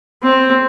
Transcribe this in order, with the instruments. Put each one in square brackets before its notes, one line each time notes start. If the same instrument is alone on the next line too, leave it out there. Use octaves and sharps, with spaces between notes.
[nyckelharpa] C4